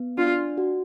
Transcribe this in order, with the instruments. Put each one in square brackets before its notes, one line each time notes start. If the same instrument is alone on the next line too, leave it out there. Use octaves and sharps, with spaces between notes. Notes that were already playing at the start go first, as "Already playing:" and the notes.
Already playing: [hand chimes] B3
[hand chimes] D4 [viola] F4
[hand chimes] F#4